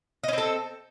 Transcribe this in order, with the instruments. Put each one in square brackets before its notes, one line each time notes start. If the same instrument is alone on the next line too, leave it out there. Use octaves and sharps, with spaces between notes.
[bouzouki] D#5
C#4
C4
A4